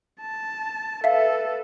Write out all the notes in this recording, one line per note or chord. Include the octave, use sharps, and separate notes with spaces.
A5
A4 B4 E5 F5